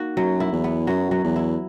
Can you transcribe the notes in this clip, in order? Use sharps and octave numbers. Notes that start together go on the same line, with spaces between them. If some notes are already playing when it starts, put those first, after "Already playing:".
Already playing: A#3 D#4 F#4
F#2 F#3
E4
E2
B3
F#2 F#3
F#3
E2
E4